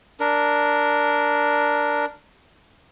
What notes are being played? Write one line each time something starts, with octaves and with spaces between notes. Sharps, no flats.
D4 A#4